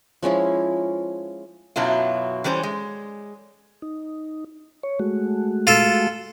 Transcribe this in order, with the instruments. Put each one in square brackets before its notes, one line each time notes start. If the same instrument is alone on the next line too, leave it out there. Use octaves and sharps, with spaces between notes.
[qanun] F3 G#3 C#4 E4
[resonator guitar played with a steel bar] F#2 B2 F#3 E4 F4
E3 G3 C#4 A#4 C5
G#3
[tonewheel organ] D#4
C#5
G#3 A3 F#4
[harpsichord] F4 A4